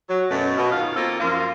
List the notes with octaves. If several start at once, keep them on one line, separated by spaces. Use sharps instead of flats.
F#3
F#2 B2 A3
B2
D#3 F4 F5
A#3 C4 F4 A4
F#2 F3 A#3 F4